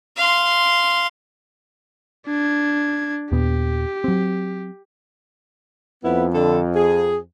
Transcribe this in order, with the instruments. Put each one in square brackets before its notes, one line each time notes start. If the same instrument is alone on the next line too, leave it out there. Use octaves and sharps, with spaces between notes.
[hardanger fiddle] F5 C6
[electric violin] D4 G#6
[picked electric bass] D#2 A#2 B3 [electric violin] G4
[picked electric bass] F#3 C4
[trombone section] F2 [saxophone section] B3 E4
[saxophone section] D3 A4
G#4